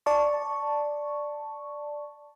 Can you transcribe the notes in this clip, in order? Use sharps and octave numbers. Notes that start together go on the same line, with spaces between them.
D5 A5 C#6